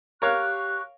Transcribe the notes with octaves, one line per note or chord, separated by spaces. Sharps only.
G4 A#4 C#5 F5 C#6 F#6